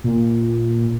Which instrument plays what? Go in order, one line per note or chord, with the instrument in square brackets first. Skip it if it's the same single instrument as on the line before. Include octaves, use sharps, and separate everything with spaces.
[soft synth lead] A#2